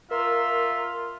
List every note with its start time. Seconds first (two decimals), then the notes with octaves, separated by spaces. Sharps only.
0.11 F4 A#4 E5 C6